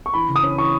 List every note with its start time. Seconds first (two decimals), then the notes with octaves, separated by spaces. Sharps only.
0.06 C#6
0.14 E3 B5
0.29 C#3
0.36 D#6
0.43 C#4
0.58 E3 C#6